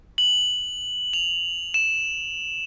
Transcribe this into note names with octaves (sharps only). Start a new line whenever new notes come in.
F#7
F7
E7